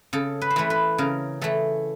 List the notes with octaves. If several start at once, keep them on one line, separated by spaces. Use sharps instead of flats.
C#3 A4
B4
C5
E3 A3 B4
B4
C#3 A#4
E3 A3 A4